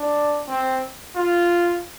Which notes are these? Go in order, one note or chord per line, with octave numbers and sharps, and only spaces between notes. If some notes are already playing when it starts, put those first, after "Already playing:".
Already playing: D4
C4
F4